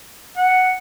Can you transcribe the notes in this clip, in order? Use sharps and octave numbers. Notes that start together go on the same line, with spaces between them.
F#5